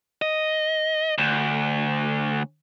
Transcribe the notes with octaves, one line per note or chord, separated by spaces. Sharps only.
D#5
D2